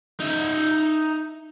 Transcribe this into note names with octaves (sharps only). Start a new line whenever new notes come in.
D#4 E5